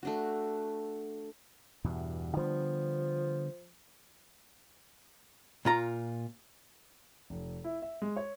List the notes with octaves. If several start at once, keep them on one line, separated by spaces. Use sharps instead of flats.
A3 D4 F#4
E2 G2 B2
D3 F3 G3 B3
A#2 F4 A#5
F1
E4
E5
G#3
C#5